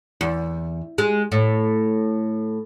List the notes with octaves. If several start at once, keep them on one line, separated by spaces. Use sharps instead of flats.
E2
G#3
A2